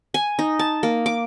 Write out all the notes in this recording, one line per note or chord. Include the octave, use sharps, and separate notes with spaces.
G#5
D#4
A5
A#3
D6